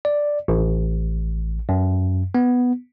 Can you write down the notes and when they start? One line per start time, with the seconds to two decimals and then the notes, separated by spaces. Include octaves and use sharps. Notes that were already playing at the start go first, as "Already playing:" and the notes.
0.05 D5
0.48 A1
1.69 F#2
2.35 B3